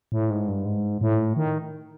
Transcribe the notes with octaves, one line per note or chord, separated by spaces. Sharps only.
A2
G#2
G2
G#2
A2
D#3